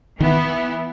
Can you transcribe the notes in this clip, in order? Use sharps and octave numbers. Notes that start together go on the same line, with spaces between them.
D#3 E3 B3 E4